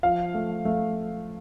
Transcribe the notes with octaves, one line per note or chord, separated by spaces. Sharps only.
F3 F5
A3
A3